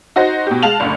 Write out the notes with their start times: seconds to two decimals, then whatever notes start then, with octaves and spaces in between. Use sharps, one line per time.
0.16 D#4 F#4 C5 A#6
0.47 B2 G4
0.62 G#3 F5 A5 F7 F#7
0.80 F#1 D2